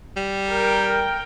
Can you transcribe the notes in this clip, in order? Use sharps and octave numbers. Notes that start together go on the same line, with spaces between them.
G3
A#4 G5